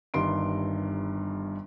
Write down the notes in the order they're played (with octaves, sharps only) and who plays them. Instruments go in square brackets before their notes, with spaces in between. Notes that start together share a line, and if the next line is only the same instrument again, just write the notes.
[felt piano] G1 G2 D#3 C6 D7